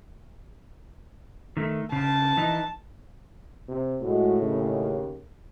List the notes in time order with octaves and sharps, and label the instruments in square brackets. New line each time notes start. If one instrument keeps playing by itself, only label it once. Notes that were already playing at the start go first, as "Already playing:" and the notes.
[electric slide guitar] D#3 A3
[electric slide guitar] C#3 [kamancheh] A5
[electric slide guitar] E3 D#4
[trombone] C3
[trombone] A2 [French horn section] G#3 F#4
[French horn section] D#2 C#3